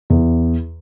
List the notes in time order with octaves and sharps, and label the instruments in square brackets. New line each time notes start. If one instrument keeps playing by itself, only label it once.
[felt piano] E2